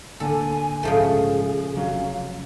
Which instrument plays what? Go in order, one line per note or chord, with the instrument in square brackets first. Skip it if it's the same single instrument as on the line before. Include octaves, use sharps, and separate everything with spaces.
[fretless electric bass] D1 D3 A#3 [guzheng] A4 [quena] G#5
[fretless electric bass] A#1 G#2 [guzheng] C#3 F3 A3 [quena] G#4
[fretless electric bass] F1 F#3 C#4 [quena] F5